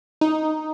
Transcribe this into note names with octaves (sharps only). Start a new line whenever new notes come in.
D#4